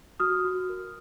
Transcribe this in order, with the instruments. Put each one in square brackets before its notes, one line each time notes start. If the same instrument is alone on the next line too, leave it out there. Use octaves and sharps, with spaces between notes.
[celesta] F#4 D#6 F6
F#4
A#4